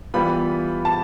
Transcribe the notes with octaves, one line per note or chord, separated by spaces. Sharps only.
E3 G3 B3 F4 B5
A5